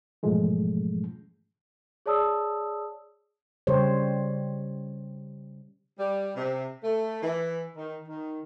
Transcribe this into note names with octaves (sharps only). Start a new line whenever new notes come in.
G#2 B2 E3 F3 G#3 A3
G#4 C#5 D5 A5 D#6 E6
C#3 G3 G4 C5 C#5
G3
C3
A3
E3
D#3
D#3